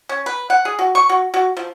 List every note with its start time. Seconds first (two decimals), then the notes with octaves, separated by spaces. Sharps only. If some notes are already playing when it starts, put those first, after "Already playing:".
0.09 C#4
0.26 B4
0.50 F#5
0.65 G#4
0.79 F#4
0.95 C#6
1.09 F#4
1.34 F#4
1.57 F3